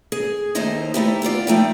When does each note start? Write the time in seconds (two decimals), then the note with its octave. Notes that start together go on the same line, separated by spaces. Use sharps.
0.12 G#4
0.55 D#2 A3 A#3 D#4 C5 D#5
0.94 A3 D#4 E4 G4
1.22 B3 E4 F4 D5
1.47 F3 A3 D#4 G5